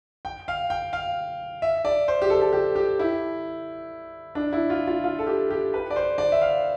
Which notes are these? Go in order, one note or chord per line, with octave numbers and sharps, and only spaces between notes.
G5
F5
G5
F5
E5
D5
C5
G4
A4
A4
G4
G4
E4
D4
E4
F4
F4
F4
A4
G4
G4
B4
D5
C5
D5
E5
F5